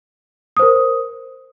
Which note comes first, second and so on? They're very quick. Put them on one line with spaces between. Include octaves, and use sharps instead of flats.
D#6 C5 A#4